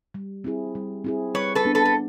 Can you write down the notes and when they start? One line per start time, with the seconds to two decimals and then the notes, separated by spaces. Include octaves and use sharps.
0.14 G3
0.44 C4 E4 G#4
0.75 G3
1.04 C4 E4 G#4
1.34 G3 B4 C#5
1.55 A4 B4
1.65 B3 D4
1.75 A4 B4
1.85 A4